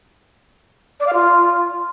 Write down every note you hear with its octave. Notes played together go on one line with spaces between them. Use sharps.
D5
F5
F4